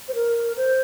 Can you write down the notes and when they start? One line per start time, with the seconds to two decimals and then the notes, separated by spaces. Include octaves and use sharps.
0.08 C5
0.15 A#4
0.57 C5